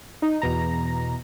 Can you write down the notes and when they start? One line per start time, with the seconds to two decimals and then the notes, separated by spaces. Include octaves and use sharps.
0.22 D#4
0.42 E2 B2 A#5